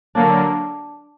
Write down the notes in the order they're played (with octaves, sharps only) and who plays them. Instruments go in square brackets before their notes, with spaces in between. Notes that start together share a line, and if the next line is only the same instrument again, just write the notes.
[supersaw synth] D3 F#3 A#3 [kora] D4